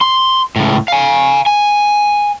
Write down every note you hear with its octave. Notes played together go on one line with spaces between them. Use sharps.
C6
C#2 A2
F5 G#5
G#5